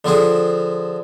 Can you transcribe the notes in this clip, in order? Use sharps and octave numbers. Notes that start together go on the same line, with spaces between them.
D3 F3 C4 G#4